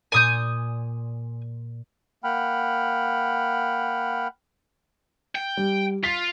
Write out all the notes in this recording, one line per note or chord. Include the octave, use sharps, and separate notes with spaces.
A#2 D5 G#5 C6 D#6 G6
A#3 F#5 G5 B5 F6
G5
G3
F4 B6